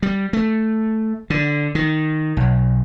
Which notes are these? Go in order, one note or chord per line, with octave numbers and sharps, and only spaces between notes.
G3
A3
D3
D#3
B1